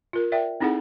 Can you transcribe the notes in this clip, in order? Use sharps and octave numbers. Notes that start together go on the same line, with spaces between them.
F4 A#4
A#4 D5 E5 G5
C4 D#4 E4 G#4 A4 F#5